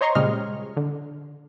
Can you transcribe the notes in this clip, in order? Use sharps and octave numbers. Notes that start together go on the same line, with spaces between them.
C5 C#5 D#5 A#5 C6 C#6
A#2 C#3 G3 G#3 D#5 F6
D3